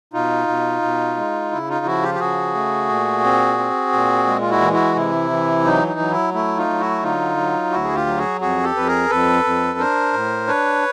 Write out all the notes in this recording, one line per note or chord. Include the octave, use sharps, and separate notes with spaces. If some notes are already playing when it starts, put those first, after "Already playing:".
B2 D#4 F4
B2
B2
G#3
C#3 E4
D#4 F4
F3 E4 F#4
F4 G4
G4
C#3 F#4 G#4
A3
A#2
C4
C4
A#2
G#3
F4
E4 F#4
E3
E4 F#4
C3 E4
E3
F#3 D#4
D#4
F#3
E4
A3 E4
D#4 F4
F#3
E4 F#4
D3 D#4 F4
F#3
D2 E4 F#4
G#4
F4 G4
F#3
F#4 G#4
F2 F#4 G#4
G4 A4
F2 B4
G#4 A#4
F2 A4 B4
F2
D4 A#4 C5
A2
D4 B4 C#5